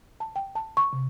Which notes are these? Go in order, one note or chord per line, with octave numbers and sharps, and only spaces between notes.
A5
G5
A5
C#6
C3